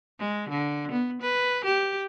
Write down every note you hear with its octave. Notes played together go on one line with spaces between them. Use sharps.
G#3
D3
B3
B4
G4